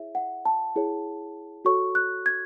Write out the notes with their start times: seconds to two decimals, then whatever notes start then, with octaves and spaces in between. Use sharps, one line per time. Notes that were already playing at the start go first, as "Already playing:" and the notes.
Already playing: E4 G#4 C#5 E5
0.15 F#5
0.45 A5
0.76 E4 G#4 C#5
1.65 F#4 A4 C#5 C#6
1.95 F#6
2.26 G#6